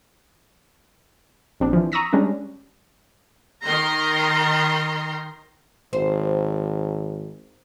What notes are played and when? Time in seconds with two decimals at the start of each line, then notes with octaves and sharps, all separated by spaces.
1.60 A#1 C4 D4
1.73 E3 F3
1.92 A#5 C#6 D#6 E6 A#6 B6
2.13 G3 G#3 C#4 D4
3.65 D#3 A#5 C6
5.93 G#1 C5